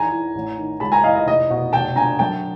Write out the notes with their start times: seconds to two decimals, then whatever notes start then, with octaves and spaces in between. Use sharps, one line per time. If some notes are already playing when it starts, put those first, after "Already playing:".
Already playing: E2 D#3 G#5 A#5
0.12 E3
0.35 A1
0.57 D#3
0.80 C#2 A5 B5
0.92 G#5 A#5
1.04 E3 D#5 F5
1.15 D#5
1.26 F1 D#5
1.50 B2
1.73 F1 G5 A5
1.96 D3 G#5 A#5
2.19 F#2 G5 A5